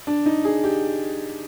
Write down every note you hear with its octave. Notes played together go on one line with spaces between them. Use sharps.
D4
D#4
G#4
G4